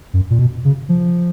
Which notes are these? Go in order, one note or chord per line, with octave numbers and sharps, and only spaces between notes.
F#2
A#2
B2
C#3
F3